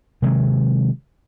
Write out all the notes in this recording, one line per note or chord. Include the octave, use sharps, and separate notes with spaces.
C3 D#3 F#3 G#3